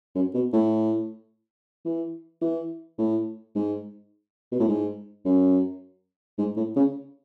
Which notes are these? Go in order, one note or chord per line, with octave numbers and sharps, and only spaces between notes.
F#2
B2
A2
E3
E3
A2
G#2
B2
A2
G#2
F#2
G#2
A2
C#3